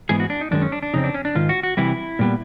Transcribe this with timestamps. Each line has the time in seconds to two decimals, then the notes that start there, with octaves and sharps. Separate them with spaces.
0.09 G#2 E3 G#3 B3 G#4
0.20 F#4
0.30 D4
0.41 D#4
0.51 F#2 D#3 G#3 D4
0.62 C#4
0.72 D4
0.83 D4
0.94 F2 C#3 C4 D#4
1.04 D4
1.14 C#4
1.25 D4
1.35 G#2 D#3 F4
1.49 F#4
1.63 F#4
1.77 C3 E3 G3 E4
2.19 A#2 G3 B3